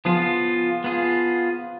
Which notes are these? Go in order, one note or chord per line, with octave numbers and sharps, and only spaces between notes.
F3 B3 F4 G#4
B3 F4 G#4